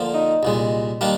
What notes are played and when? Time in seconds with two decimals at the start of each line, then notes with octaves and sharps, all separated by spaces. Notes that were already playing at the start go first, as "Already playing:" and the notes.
Already playing: D3 F3 A#3
0.14 D#4
0.43 C2 A#2 G#3
1.01 D#3 G3 A#3 D4